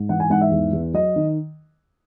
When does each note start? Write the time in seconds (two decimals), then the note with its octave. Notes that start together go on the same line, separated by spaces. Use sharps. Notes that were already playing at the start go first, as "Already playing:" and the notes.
Already playing: G#2
0.09 E3 F#5
0.20 G#5
0.30 G#2 F#5
0.41 E5
0.51 E2
0.73 E2
0.94 F#3 D#5
1.16 D#3